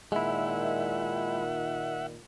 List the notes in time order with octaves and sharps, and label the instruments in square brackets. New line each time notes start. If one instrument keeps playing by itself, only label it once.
[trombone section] A#2 D#3 [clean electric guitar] G#3 E4 [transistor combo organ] E5 F#5